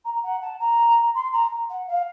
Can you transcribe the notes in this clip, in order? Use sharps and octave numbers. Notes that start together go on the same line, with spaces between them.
A#5
F#5
A5
A#5
C6
A#5
F#5
F5